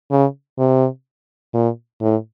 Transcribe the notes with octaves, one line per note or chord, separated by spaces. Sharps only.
C#3
C3
A#2
A2